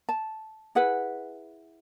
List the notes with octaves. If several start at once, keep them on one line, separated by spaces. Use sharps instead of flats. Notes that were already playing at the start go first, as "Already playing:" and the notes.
A5
E4 G#4 B4 F#5